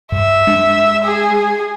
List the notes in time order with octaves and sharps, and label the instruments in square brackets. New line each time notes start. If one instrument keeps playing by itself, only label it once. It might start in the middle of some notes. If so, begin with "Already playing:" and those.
[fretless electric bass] G2 [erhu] E5
[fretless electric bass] G#3 D4
[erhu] G#4